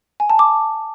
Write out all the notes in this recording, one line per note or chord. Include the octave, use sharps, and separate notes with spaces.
G#5
A5
D6